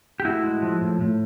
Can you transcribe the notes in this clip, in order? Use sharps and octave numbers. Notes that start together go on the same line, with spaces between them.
G4
A2 E4 F#4
G#3
F3
A2
A2